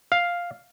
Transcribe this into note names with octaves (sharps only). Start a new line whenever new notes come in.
F5